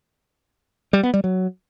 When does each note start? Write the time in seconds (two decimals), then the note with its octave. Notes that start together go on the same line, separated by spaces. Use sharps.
0.93 G3
1.03 B3
1.14 G3
1.24 F#3